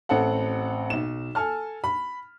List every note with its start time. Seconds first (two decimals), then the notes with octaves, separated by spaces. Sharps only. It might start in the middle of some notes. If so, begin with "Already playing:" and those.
0.09 A1 C4 A4 F#5
0.90 B1 E7
1.35 A4 G#5 A5 F6
1.84 B5